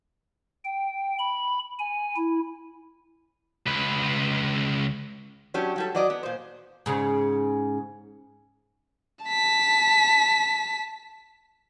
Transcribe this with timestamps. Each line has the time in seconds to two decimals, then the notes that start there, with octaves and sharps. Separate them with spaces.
0.64 G5
1.19 B5
1.79 G#5
2.16 E4
3.67 C#2 B4
5.54 F#3 C#4 D4 G4
5.76 F#3 G3 A4
5.95 F#3 D5 D#5
6.10 B3
6.23 A#2 C5
6.86 G#2 C#3
9.25 A5 B6